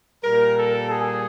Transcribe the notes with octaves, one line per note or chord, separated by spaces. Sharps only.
A#2 G3 A#4
A4
G#4